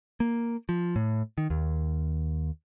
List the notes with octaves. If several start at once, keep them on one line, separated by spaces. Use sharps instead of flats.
A#3
F3
A2
D#3
D#2